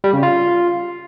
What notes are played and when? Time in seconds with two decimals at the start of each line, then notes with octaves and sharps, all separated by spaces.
0.04 G3
0.13 C#3
0.23 F4